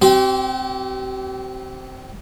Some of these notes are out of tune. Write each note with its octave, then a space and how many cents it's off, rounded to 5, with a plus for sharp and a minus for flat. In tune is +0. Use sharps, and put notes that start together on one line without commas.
C4 +0 G4 -40